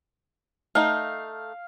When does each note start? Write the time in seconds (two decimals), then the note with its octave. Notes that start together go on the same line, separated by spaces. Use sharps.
0.75 A3 D#4 F5